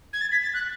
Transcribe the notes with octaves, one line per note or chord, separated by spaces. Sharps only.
G#6
A6
B6
A6
F#6